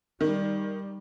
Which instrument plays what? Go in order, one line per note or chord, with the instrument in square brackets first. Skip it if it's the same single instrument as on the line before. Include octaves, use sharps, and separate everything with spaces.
[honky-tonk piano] D#3 [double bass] G3